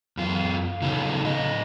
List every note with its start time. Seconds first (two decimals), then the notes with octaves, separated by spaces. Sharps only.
0.17 F#2 F4
0.82 C#3 F#3 D#4 F4 A4 C#5
1.23 A2 D#5